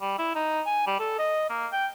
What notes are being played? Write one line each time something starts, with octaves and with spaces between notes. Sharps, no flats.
G3
E4
D#4
G#5
G3
A4
D#5
A#3
G5